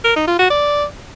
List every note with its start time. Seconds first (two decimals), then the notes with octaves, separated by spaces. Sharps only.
0.05 A#4
0.16 D#4
0.28 F4
0.39 F#4
0.50 D5